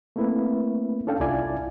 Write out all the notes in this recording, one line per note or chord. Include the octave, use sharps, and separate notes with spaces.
A3 A#3 C4 E4 B4
C#4 D4 A4 F5 G5
C2 E4 F4 D5 G#5